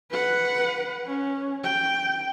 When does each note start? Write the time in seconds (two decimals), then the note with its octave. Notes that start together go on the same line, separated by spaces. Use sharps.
0.11 B4 F#5
1.06 C#4
1.64 G5